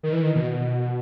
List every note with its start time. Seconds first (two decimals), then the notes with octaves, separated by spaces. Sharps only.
0.03 D#3
0.13 E3
0.22 D#3
0.35 B2